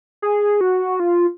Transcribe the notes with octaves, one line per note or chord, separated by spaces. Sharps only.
G#4
F#4
F4